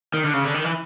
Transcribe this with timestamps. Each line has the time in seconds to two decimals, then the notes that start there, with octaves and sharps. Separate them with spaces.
0.14 D#3
0.24 D3
0.34 C#3
0.44 D3
0.54 D#3
0.64 E3